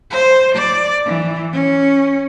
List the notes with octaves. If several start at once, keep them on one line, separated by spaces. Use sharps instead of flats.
C5
D5
E3
C#4